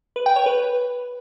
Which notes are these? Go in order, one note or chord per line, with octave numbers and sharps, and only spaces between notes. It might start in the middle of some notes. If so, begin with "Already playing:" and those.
B4
G5
C#5
B4